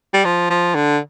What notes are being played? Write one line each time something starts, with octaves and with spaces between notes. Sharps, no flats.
G3
F3
F3
D3